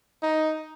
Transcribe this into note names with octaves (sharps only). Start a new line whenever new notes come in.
D#4